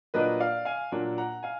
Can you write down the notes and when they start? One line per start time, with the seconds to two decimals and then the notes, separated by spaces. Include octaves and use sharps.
0.14 A#2 F#3 A#3 D4 B4 D#5
0.40 D5 F5
0.65 F5 G#5
0.92 A#2 F#3 A#3 D4
1.18 F#5 A#5
1.43 F5 G#5